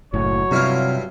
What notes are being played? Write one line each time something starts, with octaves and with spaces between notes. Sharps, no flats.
F#1 A2 F#3 C#5
G2 C3 E4 F4